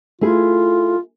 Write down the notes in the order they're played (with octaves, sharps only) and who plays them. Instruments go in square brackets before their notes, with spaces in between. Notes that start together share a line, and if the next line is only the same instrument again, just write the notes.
[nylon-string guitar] A3 E4 G#4 [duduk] F4